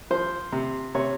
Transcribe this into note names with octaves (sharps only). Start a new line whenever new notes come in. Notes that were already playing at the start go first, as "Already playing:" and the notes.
F3 C5
C3
C3 C#5